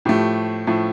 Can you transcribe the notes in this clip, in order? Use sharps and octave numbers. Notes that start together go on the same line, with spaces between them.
A2 F3 A3 G4
A2 F3 A3